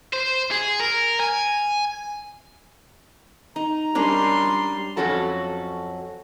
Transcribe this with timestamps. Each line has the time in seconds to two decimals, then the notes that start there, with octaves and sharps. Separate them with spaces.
0.13 C5
0.52 G#4
0.80 A#4
1.20 G#5
3.56 D#4 A#5
3.95 G3 C#4 D4 A#4 C6
4.96 F2 F#3 C#4 F#4 A4 A5